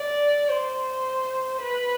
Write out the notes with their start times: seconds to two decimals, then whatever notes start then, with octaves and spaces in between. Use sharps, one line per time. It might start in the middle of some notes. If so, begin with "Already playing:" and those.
Already playing: D5
0.49 C5
1.62 B4